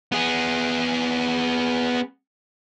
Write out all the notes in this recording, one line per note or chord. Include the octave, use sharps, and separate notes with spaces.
B3 G#4